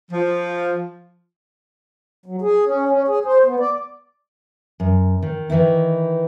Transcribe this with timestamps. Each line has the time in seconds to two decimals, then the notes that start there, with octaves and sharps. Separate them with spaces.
0.11 F3
2.26 F#3
2.42 G#4
2.66 C#4
2.89 C#4
3.08 G#4
3.25 C5
3.45 B3
3.60 D5
4.80 F#2
5.22 D#3
5.50 D#3 E3 D#4 E4